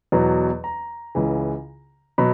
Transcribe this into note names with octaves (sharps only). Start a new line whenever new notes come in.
E2 B2 F#3
A#5
C#2 C#3 E3
B2 F#3 B5